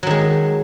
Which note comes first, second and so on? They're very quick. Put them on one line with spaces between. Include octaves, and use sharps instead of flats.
F#3 D#3 G#3